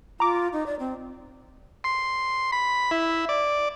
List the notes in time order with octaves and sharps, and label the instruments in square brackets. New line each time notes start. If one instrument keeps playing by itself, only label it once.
[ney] F4 [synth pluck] A#5 D6
[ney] D#4
D5
C4
[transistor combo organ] C6
B5
E4
D5